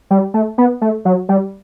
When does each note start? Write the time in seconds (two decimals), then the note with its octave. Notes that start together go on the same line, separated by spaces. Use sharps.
0.10 G3
0.34 A3
0.58 B3
0.81 A3
1.05 F#3
1.29 G3